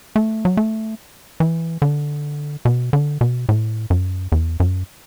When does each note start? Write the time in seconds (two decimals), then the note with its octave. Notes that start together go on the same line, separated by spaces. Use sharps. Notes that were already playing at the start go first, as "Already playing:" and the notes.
0.16 A3
0.45 F#3
0.57 A3
1.40 E3
1.82 D3
2.65 B2
2.93 D3
3.21 B2
3.49 A2
3.90 F#2
4.32 E2
4.60 F#2